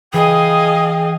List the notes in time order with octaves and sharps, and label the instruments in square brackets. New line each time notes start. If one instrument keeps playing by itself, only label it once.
[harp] E3 [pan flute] G#4 [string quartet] D#5 F5 G#5 [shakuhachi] G5